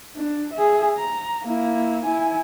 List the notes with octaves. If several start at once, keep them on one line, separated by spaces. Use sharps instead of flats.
D4
G#4 E5
A#5
A#3 E4
E4 G#5